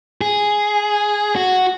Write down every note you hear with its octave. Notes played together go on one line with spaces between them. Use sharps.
G#4
F#4